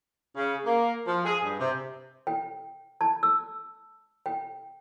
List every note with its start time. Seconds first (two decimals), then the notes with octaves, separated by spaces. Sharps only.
0.37 C#3
0.65 A#3
1.07 F3
1.25 G#4
1.45 G2
1.60 C3
2.27 G5
3.01 A5
3.23 E6
4.26 G5